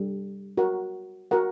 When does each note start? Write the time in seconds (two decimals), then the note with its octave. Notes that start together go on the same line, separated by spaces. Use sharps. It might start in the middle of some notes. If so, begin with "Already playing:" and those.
Already playing: G3 D4 A4
0.57 F#4 A#4 F#5
1.31 F#4 A#4 F#5